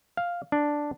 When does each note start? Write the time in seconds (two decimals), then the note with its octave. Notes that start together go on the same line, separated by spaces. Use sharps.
0.17 F5
0.52 D4